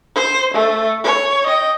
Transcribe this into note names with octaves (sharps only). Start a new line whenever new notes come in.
C5
A3
C#5
D#5 G5